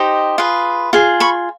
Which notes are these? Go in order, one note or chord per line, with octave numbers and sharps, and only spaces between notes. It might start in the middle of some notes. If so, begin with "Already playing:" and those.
Already playing: D#4 G4 C5 D#5
F4 G#4 B4
F4 G#4
B5 C#6